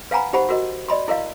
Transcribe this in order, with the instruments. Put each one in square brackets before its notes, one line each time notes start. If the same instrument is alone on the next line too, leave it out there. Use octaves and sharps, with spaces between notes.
[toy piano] B4 F5 F#5 G#5 A#5 B5
D#4 G4 C5 F#5 B5
F#4 A#4 D#5
D5 D#5 B5 C6
E4 A#4 D#5 F5